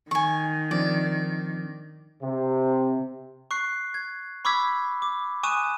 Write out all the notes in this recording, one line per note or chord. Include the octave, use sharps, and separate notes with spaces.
D#3 G#5 C#6
F3 C4 D4 D5
C3
C#6 F#6 C7
G#6
B5 C#6 D6 E6 G#6 B6
D6
G#5 C#6 D#6 F#6 D#7 E7